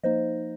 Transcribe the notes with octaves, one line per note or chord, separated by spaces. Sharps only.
F3 A#3 D#4 C5 D#5